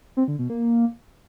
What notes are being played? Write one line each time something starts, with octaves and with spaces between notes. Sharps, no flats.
C4
D3
B2
A#3